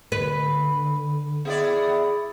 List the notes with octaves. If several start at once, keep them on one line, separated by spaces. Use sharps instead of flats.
D3 B4
B3 E4 G#4 D5